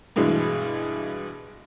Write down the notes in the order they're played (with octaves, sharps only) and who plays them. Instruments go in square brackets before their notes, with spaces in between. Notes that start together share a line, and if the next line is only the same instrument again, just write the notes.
[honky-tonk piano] G2 B2 E3 G#3